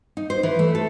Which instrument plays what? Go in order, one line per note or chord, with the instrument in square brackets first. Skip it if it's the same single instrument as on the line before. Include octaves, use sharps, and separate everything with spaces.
[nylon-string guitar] D#4
C5
E3
A3
A4